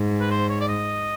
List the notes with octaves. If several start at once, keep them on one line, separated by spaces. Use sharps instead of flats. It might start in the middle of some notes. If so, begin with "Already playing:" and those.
Already playing: G#2
B4
C5
C#5
D5
D#5